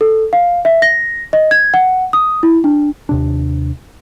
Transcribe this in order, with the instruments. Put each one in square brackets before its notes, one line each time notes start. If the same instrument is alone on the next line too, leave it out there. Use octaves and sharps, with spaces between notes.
[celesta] A4
F5
E5
A#6
D#5
G#6
F#5
D#6
E4
D4
[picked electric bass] D#2 C3 D4